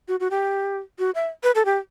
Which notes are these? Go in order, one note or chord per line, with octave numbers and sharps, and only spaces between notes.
F#4
F#4
G4
F#4
E5
B4
A4
G4